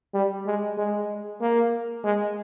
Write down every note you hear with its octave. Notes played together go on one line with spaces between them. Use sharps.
G3
G#3
G#3
A#3
G#3